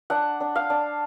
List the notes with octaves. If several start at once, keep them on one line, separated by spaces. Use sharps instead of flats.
D4 F#5
D4
F5
D4